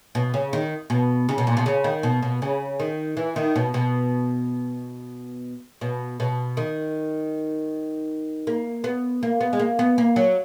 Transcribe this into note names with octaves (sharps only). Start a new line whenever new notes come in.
B2
C#3
D#3
B2
C#3
B2
A#2
B2
C#3
D#3
B2
B2
C#3
D#3
E3
D#3
B2
B2
B2
B2
D#3
A#3
B3
A#3
B3
G#3
A#3
B3
A#3
F#3